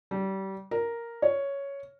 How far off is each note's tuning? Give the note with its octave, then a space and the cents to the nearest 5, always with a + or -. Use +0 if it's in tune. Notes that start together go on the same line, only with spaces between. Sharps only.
G3 -25
A#4 +0
C#5 +5